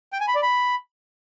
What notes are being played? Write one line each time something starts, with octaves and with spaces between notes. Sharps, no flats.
G5
G#5
B5
D5
B5